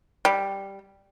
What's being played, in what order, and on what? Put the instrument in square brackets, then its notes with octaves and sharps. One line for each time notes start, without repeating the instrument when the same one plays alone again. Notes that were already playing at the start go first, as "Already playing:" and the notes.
[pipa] G3